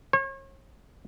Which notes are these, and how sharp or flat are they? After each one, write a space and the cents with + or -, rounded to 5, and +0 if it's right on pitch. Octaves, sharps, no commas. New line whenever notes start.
C#5 -40